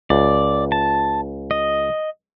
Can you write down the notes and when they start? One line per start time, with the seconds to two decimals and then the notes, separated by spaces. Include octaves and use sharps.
0.10 C#2 D5
0.72 A5
1.51 D#5